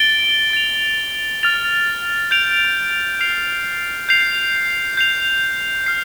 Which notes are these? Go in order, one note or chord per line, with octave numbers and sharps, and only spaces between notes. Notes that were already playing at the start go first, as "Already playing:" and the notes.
Already playing: A6 D7 G7
A6 F7
F6 A6 F7
G6 D7 F7
F6 C7 F7
G6 C7 F7
G6 C7 F7
F6 C7